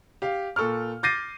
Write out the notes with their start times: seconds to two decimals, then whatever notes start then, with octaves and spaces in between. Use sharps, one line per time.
0.22 G4 F5
0.56 A#2 A4 C#6 F6
1.03 D6 G6 A6 A#6 C7 D#7